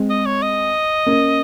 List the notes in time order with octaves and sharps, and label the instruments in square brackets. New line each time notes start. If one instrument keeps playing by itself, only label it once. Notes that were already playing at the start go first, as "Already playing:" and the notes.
Already playing: [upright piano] G#3 C4
[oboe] D#5
C#5
D#5
[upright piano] A#3 C#4